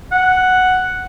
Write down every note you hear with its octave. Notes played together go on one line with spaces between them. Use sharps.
F#5